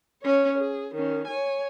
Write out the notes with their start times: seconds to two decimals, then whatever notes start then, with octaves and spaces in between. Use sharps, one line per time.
0.22 C#4 C#5
0.58 G#4
0.94 D#3 C#4
1.27 C#5 G#5